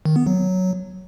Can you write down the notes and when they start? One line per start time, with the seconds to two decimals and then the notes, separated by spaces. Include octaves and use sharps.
0.05 D#3
0.16 B3
0.27 F#3